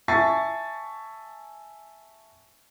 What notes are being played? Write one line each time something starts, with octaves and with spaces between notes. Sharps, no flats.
E5 G#5 A5 C#6 A6 C7